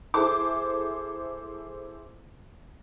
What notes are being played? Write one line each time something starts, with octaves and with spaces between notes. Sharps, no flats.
E4 G#4 A4 C5 D6